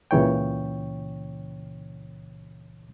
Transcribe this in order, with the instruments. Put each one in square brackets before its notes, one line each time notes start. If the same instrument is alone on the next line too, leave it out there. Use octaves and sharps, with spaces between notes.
[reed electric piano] C#2 A#2 C#3 E3 C#5 G5